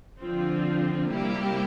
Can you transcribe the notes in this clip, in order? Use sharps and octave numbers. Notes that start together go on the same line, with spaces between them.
D3 F3 C4 F4
C3 G3 A#3 E4 G4